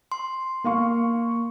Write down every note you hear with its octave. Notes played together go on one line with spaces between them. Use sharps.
C6
A#3 F5 C#6